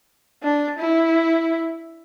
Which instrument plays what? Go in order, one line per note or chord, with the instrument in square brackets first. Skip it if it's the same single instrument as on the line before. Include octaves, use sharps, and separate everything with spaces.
[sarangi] D4
E4